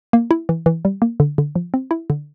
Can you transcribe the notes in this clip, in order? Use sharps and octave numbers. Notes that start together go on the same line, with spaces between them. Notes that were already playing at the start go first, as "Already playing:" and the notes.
A#3
E4
E3
E3
G3
A#3
D3
D3
F3
C4
E4
D3